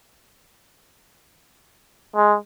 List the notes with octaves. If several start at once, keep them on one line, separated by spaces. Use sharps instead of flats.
G#3